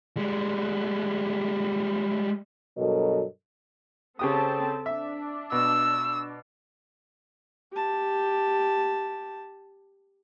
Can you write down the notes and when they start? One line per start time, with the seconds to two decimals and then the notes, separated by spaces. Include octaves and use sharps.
0.17 G3 G#3
2.77 G2 B2 F#3 A4 A#4 D#5
4.19 C#3 C4 G4 A4 A5 D#6
4.86 D4 E5
5.52 B2 E6
7.73 G4 A5